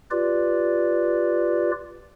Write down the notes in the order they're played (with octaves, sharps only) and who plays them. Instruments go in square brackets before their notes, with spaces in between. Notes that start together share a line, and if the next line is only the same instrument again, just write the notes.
[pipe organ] F4 G4 B4 D5